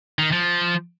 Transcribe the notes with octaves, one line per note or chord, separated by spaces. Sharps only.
D#3
F3